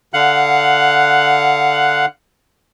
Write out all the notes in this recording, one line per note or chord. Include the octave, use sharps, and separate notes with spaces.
D3 F5 F#5 F#6